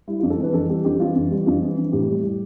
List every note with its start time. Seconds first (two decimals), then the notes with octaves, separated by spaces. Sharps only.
0.07 G3 E4
0.19 F4
0.23 F2
0.30 A4
0.38 E3 B4
0.53 F2 A4
0.69 G3 G4
0.84 F2 G4
1.00 E3 F4
1.15 F2
1.30 G3
1.46 F2 F4
1.61 E3
1.78 F2
1.92 A2 G4
2.09 G3
2.23 G3